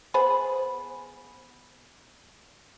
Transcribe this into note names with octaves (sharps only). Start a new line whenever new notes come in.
B3 G#4 C5 B5